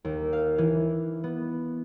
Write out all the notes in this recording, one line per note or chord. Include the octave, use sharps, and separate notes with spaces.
D#2
F5
E3
B3